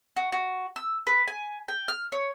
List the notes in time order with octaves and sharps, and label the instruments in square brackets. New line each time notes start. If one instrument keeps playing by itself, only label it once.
[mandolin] F#4
F#4
E6
B4
G#5
G5
F6
C#5